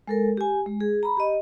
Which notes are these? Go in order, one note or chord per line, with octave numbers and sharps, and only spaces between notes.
G#3 A4 A#4
G4 G#5
G#3
G#4
A#5 B5
G4 D#5